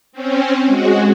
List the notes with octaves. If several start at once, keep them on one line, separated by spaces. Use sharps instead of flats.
C4 C#4
G#3 F#4